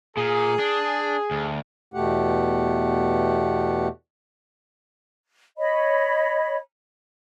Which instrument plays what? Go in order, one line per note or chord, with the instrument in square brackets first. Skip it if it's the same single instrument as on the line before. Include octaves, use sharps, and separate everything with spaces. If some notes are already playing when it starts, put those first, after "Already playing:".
[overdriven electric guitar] A#2 [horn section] G#4
[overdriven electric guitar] D4
D2
[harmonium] E2 B2 A3 G4 F#5
[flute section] C#5 D#5 B5